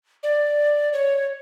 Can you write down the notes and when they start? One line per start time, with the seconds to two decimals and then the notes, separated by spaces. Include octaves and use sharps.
0.23 D5
0.93 C#5